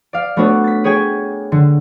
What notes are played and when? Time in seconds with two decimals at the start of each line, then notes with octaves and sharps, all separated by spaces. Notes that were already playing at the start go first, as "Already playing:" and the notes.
0.13 D5 F5
0.37 A3 B3 D4 F#4 B4 C#5
0.64 A6 B6
0.84 G#4 C#5 G5 G#5
1.52 D3